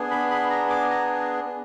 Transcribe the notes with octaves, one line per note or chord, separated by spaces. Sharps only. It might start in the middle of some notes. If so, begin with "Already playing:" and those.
Already playing: B3 D4 G#4
B5
B5
A#5
D6
A#5